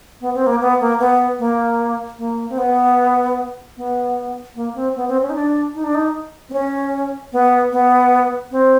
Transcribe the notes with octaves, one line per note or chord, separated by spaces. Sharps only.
B3
C4
A#3
B3
A#3
B3
A#3
A#3
C4
B3
B3
A#3
C4
B3
C4
C#4
D#4
D4
D#4
D4
D#4
C4
C#4
B3
B3
C4